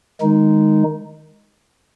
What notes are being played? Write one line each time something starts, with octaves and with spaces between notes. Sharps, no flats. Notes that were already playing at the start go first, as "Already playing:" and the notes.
D#3 G#3 D#4